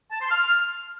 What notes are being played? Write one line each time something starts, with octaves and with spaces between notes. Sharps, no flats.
A5
C6
F6